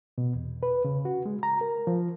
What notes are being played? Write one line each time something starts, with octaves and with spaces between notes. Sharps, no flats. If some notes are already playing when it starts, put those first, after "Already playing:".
B2
E2
B4
C#3
F#4
G#3
A#5
A#4
F3